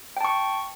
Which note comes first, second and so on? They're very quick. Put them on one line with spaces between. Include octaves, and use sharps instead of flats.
G5 A5 C#6